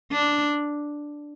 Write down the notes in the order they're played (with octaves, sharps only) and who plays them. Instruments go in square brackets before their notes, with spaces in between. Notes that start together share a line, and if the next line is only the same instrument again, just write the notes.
[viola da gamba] D4